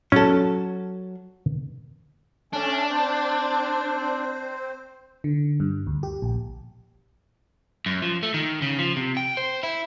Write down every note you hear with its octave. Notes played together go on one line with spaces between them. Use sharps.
F#3 C#4 A4
A3 C#4 D4
C4 C5
D3
G2
D2
G4
A#1
F#2
F3
A3
D#3
C#3
F3
C3
G5
C5
E4